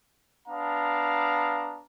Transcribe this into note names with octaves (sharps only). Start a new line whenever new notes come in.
B3 D4 F5 A#5